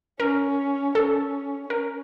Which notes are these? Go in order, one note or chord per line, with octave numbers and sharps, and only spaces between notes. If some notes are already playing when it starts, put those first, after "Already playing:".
C#4 A#4
C#4 A4
C#4 A#4